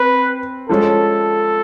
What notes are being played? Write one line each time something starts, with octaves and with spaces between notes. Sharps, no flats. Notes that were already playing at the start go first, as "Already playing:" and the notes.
Already playing: C4 B4
F3 G#3 C#4 A4